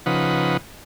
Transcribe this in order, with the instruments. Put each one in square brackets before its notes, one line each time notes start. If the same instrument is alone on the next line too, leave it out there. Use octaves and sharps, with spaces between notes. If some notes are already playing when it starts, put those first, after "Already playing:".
[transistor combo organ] C#3 F3 D#4 B4 F#5